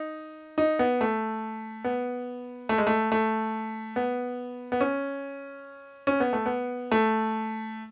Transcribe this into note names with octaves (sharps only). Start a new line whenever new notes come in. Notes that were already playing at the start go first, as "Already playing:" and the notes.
Already playing: D#4
D#4
B3
A3
B3
A3
G#3
A3
A3
B3
B3
C#4
C#4
B3
A3
B3
A3